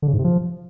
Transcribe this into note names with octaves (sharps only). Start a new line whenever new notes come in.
D3
C#3
G#2
C3
F3